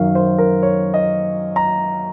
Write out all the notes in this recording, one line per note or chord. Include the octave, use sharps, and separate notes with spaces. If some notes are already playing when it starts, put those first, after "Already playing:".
Already playing: F#2 D#3 F5
C5
A#4
C#5
D#5
A#5